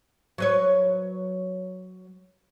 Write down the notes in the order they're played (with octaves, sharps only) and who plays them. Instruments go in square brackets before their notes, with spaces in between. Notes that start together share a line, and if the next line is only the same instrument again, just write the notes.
[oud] F#3 B4 C#5